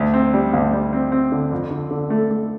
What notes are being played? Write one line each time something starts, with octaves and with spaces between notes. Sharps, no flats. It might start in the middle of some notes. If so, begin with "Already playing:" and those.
Already playing: D2
C4
G3
D2
G3
C4
C4
D3
F2
D3
D3
A3
A3